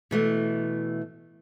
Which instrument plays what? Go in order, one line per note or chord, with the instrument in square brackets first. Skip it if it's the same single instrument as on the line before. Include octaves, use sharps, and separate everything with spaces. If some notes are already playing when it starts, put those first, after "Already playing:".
[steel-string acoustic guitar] B2 E3 A3